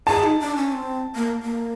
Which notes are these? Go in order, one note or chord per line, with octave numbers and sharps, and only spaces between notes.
G#4 A5
D#4
D4
C#4
C4
A#3
A#3